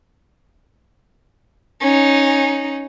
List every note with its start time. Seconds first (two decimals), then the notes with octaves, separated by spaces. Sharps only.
1.81 C#4 D#4